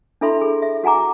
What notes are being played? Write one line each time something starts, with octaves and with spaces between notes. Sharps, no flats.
D4 E4 A4 E5 B5 C6
G#4
E5
F#4 F#5 G#5 A#5 D6